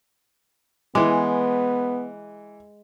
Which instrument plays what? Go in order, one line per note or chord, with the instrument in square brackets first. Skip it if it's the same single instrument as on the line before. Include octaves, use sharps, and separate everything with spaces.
[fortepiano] E3 D6 [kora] G#3 [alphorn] B3